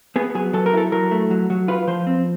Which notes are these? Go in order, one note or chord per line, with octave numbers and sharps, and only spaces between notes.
B3 G#4
F#3 G#4
F#3 A4
A#4
E4 A4
F#3 A#4
A3
F#3
F#3
F4 B4
F3 C5
C4